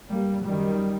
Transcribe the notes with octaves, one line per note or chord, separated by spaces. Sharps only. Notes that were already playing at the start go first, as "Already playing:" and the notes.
G2 G3 A#3
F#2 D#3 G3